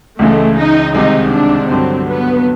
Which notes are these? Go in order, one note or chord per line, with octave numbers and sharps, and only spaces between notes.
C#2 C#3 E3 G#3 A3
D#4
C2 C3 D#3 G#3 D#4
D4
G2 D3 F#3 C4
B3